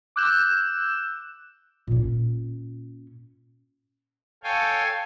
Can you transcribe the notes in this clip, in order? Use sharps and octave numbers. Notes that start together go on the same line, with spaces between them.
D6 E6 F#6 G6 E7
A#2 C#4
A4 C#5 F5 G5 G#5